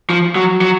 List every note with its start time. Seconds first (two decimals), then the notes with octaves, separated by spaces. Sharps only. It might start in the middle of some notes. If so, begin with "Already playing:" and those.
0.10 F3
0.35 F#3
0.61 F#3